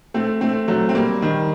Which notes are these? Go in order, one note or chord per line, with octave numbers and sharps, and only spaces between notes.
A3 C4
A3 C4
F#3 A3
C4
G3 A#3
D#3 G3